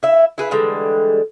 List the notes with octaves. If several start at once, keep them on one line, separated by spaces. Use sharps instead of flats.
E4 E5
E4 G#4 B4
D3 E3 G3 G#3